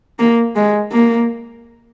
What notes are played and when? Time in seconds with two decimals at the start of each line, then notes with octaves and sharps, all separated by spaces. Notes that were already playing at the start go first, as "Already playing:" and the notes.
0.19 A#3
0.56 G#3
0.92 A#3